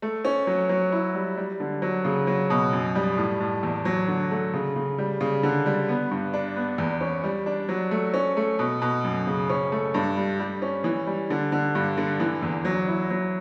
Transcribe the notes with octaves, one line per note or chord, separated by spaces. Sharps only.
A3
C#4
F#3
F#3
E4
G3
G3
D3
F#3
C#3
F#3
B2
F#2
G3
A2
A2
E2
F#3
D3
A3
C#3
C#3
G3
C#3
D3
G3
B3
G2
D4
B3
E2
C#4
G3
D4
F#3
A3
C#4
A3
B2
B2
F#2
C#3
C#4
A3
G2
G3
G3
C#4
E3
G3
D3
D3
G2
D3
E3
E2
F#3
E4
F#3